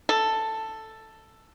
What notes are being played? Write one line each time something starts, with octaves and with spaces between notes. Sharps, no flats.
A4